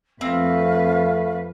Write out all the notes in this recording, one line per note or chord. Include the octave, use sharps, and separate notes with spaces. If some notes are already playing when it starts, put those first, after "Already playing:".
F2 A3 C4 B4 F5